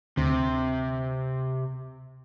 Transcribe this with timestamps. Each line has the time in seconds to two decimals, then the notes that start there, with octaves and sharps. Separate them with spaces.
0.17 D2 C3